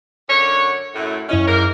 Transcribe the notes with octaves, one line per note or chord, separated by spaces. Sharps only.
F#2 D3 C#5
F#2 A2
F#2 C#4 E4 D#5
G#2 A#3 A#4